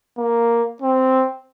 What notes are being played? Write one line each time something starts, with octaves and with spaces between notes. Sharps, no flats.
A#3
C4